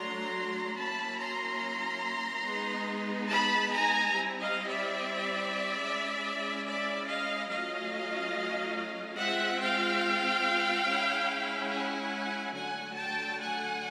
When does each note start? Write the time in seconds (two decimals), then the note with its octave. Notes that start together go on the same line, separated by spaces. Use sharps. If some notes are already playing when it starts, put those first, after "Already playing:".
Already playing: F#3 A3 D4 A#5 C6
0.76 F#3 A#3 C#4 E4 A5 B5
1.18 A#5 C6
2.44 G#3 B3 D#4
3.28 A5 B5
3.70 G#5 A#5
4.12 G3 C4 E4
4.41 D#5 F5
4.68 D5 E5
5.81 G#3 C#4 E4
6.65 D5 E5
7.07 D#5 F5
7.49 F#3 A3 C#4 F4 D#5 F5
9.17 G#3 C4 F4 E5 F#5
9.59 F5 G5
10.85 G#3 C#4 E4
11.70 F#5 G#5
12.53 D3 F#3 A3 F#5 G#5
12.95 G5 A5
13.38 F#5 G#5